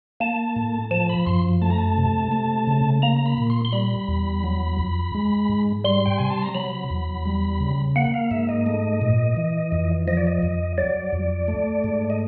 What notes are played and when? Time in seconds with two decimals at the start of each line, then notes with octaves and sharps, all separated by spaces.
0.20 A#3 A5
0.56 A2
0.91 F3 A5
1.09 B5
1.26 F#2 C6
1.62 A3 A5
1.70 A#5
1.78 A5
1.97 C3
2.32 A3
2.67 C#3
3.02 A#3 A#5
3.16 A#5
3.26 B5
3.38 A#2
3.50 C6
3.65 C6
3.73 G3 B5
4.08 E2
4.44 F#3
4.79 F2
5.15 G#3
5.49 G#2
5.84 G3 C6
6.06 G5
6.18 C3 G#5
6.30 A5
6.43 A#5
6.55 F#3 B5
6.90 E2
7.25 G3
7.60 C#3
7.96 A#3 F#5
8.14 F5
8.31 G#2 E5
8.49 D#5
8.66 A3
9.01 A#2
9.37 E3
9.72 F2
10.08 F3 D#5
10.17 D5
10.27 D#5
10.43 F2
10.78 F#3 D5
11.13 F2
11.48 A3
11.84 G#2
12.10 D#5